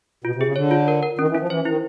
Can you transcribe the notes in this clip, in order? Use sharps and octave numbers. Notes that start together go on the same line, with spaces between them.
B2 F4
C3
G#4
C#3
D3 C#5
F4
A#4
A#4
D#3 C#4
E3
C#4
F3
E3 C5
D#3 E4